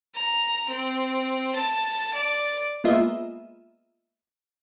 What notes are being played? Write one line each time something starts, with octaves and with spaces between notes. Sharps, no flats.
A#5
C4
A5
D5
G#3 A#3 B3 F4 D#5 E5